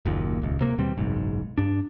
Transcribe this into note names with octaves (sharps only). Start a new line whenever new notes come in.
F#1 D#2 A#2
D#1 C#2
D1 C3 A#3
D#2 B2 G3 C4
F#1 B1 G#2
G2 D4